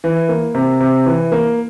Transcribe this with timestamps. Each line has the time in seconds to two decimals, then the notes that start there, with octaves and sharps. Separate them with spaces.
0.04 E3
0.29 A#3
0.55 C3
0.80 C3
1.06 E3
1.32 A#3